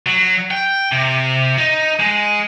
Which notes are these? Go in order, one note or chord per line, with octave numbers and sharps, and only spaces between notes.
F#3
G5
C3
D#4
G#3